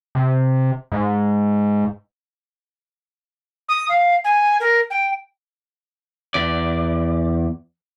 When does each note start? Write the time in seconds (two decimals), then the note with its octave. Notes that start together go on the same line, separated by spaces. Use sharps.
0.15 C3
0.92 G#2
3.69 D#6
3.89 F5
4.24 G#5
4.60 A#4
4.90 G5
6.34 E2 D5